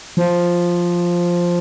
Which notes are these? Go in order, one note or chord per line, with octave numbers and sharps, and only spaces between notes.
F3